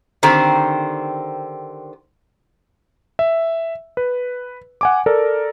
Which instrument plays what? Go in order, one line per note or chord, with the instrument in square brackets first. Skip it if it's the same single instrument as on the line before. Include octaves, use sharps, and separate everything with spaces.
[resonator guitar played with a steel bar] D3 D#3 C4 G4 C5
[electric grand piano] E5
B4
F#5 G#5 D6
A4 A#4 D5